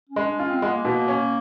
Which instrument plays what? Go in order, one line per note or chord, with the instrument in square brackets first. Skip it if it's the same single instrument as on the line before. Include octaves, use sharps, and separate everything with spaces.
[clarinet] C#4
[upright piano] G#3
[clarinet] D4
[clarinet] C#4 [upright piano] F4
[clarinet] C4
[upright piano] G#3 [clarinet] B3
[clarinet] A#3
[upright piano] B2
C#4